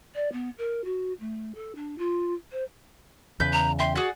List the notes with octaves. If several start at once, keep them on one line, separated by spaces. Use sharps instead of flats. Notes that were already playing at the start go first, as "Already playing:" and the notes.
D5
B3
A#4
F#4
A3
A4
D4
F4
C5
E2 C#3 B4 G6
A#5
E5 G5 C6
F#4 G#4 D5 F#5